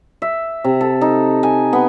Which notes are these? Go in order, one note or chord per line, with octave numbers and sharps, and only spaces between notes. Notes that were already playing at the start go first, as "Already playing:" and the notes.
E5
C3
A4
D#4
G#5
B3